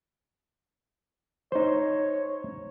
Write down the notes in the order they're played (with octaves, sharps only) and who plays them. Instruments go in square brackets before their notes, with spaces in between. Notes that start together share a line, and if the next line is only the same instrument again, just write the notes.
[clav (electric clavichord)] D#4 C5 [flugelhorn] C#5